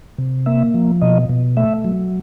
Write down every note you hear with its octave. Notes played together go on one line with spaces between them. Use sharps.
C3
A#3 E5
F3
B2 D#5
B2
A3 E5
F#3